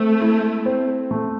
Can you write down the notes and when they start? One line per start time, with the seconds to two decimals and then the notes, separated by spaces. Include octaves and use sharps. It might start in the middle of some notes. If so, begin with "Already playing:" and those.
Already playing: A3 C4
0.21 E4
0.66 C4
1.11 A3